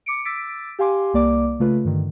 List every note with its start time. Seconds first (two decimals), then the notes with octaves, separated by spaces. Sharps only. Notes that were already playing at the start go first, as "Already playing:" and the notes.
0.06 D6 C#7 D7
0.25 D6 E6 A6 B6 D7
0.79 G4 F5 G#5 C6 D6
1.13 C2 A#3 D5 D6
1.60 C#3 A3 F4 B4
1.85 G2 D3 D#3